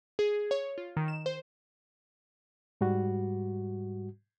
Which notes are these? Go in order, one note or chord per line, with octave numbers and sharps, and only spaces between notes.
G#4
C#5
F4
D#3
E7
C5
G#2 G3 F#4